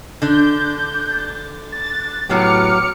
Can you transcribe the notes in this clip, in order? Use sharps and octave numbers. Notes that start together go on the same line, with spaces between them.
D3 D4 G6
A6
A2 F#3 B3 G4 D6 F6 C#7